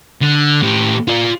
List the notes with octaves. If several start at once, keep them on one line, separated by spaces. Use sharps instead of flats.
D3
A2 G4
F4 D5